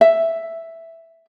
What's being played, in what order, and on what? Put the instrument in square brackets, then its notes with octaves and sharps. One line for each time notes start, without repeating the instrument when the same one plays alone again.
[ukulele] E5